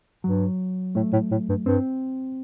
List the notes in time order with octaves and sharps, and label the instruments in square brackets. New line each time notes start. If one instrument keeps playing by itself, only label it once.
[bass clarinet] G2 [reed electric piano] F#3
[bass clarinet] A2 [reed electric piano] A3
[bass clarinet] A2
A2
G2
[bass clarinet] G2 [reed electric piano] C4